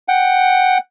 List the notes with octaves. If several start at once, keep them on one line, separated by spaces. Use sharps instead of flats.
F#5 G5